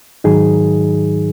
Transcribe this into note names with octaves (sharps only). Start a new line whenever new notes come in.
G#2 D#3 F#3 D#4 G#4